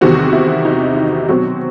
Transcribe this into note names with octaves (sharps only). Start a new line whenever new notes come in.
E2 C3 D#3 G3 C4 F#4
E4
D#4
E4
B2 F#3 C4 F#4